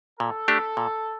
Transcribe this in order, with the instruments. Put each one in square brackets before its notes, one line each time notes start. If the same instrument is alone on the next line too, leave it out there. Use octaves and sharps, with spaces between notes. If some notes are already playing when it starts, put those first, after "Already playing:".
[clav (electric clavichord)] A#2 [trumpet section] A4
[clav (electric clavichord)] A3 D4 G4
A#2